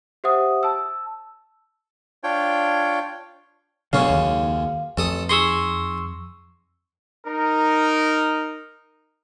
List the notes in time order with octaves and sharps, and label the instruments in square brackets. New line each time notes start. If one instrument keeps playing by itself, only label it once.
[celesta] G4 C5 E5 F#5 D#6
A5 E6
[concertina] D4 F4 C#5 G5
[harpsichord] C#2 F#2 C#4 [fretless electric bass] B2 D3 F#3 [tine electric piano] F5
[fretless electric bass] D#2
[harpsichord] A1 A4 D#6 [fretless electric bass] F2
[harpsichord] D#4 G#4 [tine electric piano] C6 C#6 E6
[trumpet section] D#4 A#4